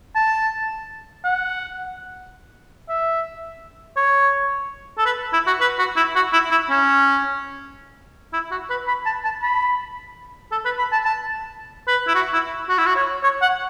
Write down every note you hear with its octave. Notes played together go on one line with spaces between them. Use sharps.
A5
F#5
E5
C#5
A4
B4
E4
F#4
B4
F#4
E4
F#4
E4
E4
C#4
E4
F#4
B4
B5
A5
A5
B5
A4
B4
B5
A5
A5
B4
E4
F#4
E4
F#4
E4
F#4
C#5
C#5
F#5